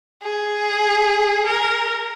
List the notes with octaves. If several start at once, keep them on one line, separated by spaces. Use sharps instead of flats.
G#4
A#4